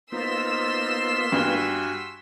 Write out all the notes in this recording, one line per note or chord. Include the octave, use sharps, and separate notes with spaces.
A#3 B3 D#4 F4 C5 C6 E6 B6
G2 F#4 G#5 G7